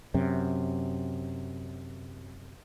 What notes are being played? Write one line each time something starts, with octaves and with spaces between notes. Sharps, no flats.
F#2 C3